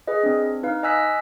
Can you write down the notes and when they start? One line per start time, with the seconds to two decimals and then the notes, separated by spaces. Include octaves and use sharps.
0.07 G#4 B4 D#5
0.23 C4 D4
0.63 D#4 B4 F5
0.83 D#5 G#5 E6 F#6 B6